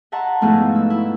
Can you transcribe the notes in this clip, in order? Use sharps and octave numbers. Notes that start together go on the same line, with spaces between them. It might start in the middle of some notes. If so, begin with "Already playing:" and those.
D#5 E5 F#5 A5 A#5 C6
G#2 B2 F3 A3 B3 E4
E6
E4